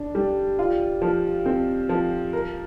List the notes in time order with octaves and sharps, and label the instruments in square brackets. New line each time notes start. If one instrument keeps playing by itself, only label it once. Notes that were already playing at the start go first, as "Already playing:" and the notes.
Already playing: [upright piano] D4
G3
F4
F3
C4
F3
A#4